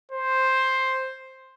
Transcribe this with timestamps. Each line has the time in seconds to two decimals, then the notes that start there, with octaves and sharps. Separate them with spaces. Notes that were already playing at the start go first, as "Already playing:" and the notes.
0.12 C5